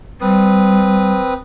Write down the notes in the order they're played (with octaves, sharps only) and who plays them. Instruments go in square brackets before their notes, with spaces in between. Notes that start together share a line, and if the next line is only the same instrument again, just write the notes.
[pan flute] G3 [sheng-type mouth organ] C4 B4 D#6